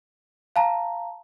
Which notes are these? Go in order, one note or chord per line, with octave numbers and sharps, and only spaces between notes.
F5 A5 A#5